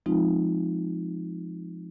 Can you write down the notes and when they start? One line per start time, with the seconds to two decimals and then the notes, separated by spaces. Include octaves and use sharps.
0.06 F3 G#3 C4 D#4 F4